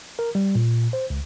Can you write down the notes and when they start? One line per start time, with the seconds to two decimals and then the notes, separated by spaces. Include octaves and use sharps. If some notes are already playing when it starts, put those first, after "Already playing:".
0.19 A#4
0.35 G3
0.55 A#2
0.93 C5
1.10 C#2